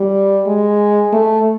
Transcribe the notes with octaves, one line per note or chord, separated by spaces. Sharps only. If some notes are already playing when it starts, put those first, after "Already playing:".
Already playing: G3
G#3
A3